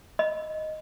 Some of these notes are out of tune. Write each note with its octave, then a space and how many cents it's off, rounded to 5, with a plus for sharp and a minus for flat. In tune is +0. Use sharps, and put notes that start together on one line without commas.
D#5 +0 B5 +0